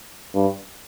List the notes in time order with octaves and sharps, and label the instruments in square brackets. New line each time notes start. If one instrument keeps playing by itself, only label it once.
[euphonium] G2